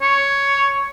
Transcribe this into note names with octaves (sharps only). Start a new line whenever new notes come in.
C#5